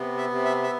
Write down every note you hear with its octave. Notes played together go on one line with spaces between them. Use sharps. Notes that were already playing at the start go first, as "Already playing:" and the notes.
Already playing: C3 B3
E5
C3
E5
E5